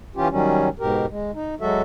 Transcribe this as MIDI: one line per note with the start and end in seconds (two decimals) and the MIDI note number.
0.16 0.28 52
0.16 0.28 61
0.16 0.28 65
0.16 0.28 67
0.30 0.69 51
0.30 0.69 54
0.30 0.69 55
0.30 0.69 61
0.79 1.06 44
0.79 1.06 47
0.79 1.06 67
0.79 1.06 70
1.10 1.31 56
1.34 1.55 63
1.61 1.82 54
1.61 1.82 56
1.61 1.82 66
1.61 1.82 69
1.61 1.82 76